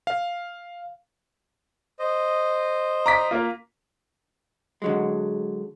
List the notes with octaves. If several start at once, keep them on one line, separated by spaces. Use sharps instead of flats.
F5
C5 D#5
A#5 D6 B6
A#3 F4
D3 F#3 G#3